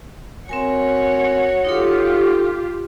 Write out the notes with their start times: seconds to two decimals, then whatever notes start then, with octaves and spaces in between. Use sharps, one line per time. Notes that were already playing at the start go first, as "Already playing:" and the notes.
0.49 C4 F#4 A#4 C#5 G#5
1.65 D#4 F4 G4 A4